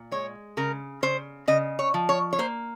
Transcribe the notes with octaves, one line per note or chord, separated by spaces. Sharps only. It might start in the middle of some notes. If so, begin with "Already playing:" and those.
Already playing: A#2
G#3 C#5
C#3 A#4
C#3 C5
C#3 D#5
C#5
F3
C#5
C#5
A#3 C5